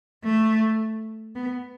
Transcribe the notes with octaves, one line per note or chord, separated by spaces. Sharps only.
A3
B3